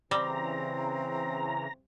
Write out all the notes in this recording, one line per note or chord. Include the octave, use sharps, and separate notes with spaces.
C#3 E3 G3 C4 A#5